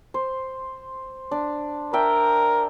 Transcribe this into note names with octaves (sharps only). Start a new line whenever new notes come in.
C5
D4
D4 A#4 E5 G5